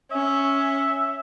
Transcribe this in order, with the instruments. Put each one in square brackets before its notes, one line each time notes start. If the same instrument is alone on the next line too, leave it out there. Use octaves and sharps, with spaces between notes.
[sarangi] C#4 [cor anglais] E5